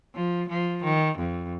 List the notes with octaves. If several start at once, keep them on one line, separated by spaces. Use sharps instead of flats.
F3
F3
D#3
F2